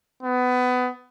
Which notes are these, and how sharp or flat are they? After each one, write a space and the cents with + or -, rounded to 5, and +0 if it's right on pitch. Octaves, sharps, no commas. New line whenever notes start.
B3 +20